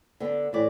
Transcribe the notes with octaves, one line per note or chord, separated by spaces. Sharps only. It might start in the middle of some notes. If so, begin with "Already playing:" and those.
D3 B3 D4
A2 E3 D5